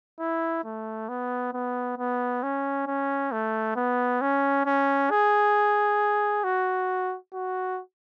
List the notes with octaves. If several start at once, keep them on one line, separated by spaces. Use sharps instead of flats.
E4
A3
B3
B3
B3
C#4
C#4
A3
B3
C#4
C#4
G#4
F#4
F#4